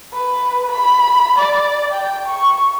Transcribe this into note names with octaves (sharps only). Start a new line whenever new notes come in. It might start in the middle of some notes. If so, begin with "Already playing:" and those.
B4
B5
D5
G5
C#6